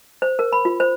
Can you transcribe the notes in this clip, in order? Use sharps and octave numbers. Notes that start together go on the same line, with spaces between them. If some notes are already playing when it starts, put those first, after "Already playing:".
C5
A#4
B5
F4
C5